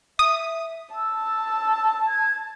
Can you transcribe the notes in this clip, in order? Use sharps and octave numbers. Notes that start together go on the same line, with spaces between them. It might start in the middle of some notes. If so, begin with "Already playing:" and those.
E5 D#6
A5 E6
G#6